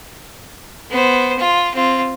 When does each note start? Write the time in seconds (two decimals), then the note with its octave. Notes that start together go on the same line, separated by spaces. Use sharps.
0.90 B3 C5
1.39 F4
1.74 C4 F4